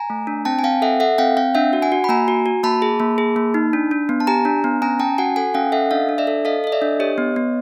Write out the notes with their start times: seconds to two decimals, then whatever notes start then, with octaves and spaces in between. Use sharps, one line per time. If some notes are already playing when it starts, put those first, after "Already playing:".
Already playing: G#5 A#5
0.10 A3
0.27 D4
0.45 C4 G5 A5
0.59 G#5
0.64 C4 F5 G5
0.82 A4 E5 F#5
1.00 A4 E5 F#5
1.18 C4 F5 G5
1.37 C4 F5 G5
1.55 D4 E5 F#5
1.73 F#4
1.82 F#5 G#5
1.92 F#4
2.04 B5
2.09 A#3 G#5 A#5
2.28 F#4
2.46 F#4
2.63 A#3 A5 B5
2.82 G#4
3.00 A#3
3.18 G#4
3.36 A#3
3.54 D#4
3.73 D4
3.91 D4
4.09 B3
4.20 A5
4.27 G4 G#5 A#5
4.45 D4
4.64 B3
4.82 C#4 G#5 A#5
4.99 C#4 G5 A5
5.18 F#4 F#5 G#5
5.36 A4 F#5 G#5
5.54 C#4 F5 G5
5.72 A4 E5 F#5
5.91 D4 D#5 F5
6.09 D4
6.18 D5 E5
6.27 A4
6.45 A4 D#5 F5
6.64 A4 D#5
6.72 D5 E5
6.82 D4
7.00 G4 C#5 D#5
7.18 B3
7.36 B3